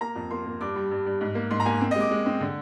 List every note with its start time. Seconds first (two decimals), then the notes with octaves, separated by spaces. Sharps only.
0.01 A#3 A#5
0.16 F2
0.31 A#3 C6
0.46 A#3
0.61 G2 D6
0.76 G3
0.91 G2
1.06 G2
1.21 G#2
1.35 A#3
1.51 G#2 C6
1.60 A#5
1.66 A#3 G#5
1.81 C4
1.91 D#5
1.96 G#3 D6
2.11 G#3
2.26 C4
2.41 D3